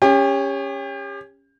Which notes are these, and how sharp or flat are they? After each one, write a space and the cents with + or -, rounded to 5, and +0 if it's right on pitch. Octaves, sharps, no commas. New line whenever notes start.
C#4 +0 G4 +35